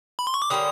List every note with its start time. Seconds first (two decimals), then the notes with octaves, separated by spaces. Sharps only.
0.19 B5
0.27 C6
0.34 C#6
0.42 D6
0.50 D3 G3 A#3 C#4 D#6